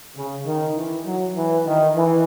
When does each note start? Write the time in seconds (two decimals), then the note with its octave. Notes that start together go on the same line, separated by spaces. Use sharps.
0.16 C#3
0.45 D#3
0.75 E3
1.05 F#3
1.35 E3
1.65 D#3
1.95 E3